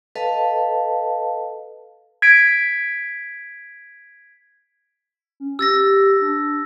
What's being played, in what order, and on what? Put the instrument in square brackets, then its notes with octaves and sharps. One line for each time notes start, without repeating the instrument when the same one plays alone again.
[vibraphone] A4 B4 D#5 F5 A5
[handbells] G#6 B6 D7
[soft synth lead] C#4
[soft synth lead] G4 [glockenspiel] E6 A6 A#6
[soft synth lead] D4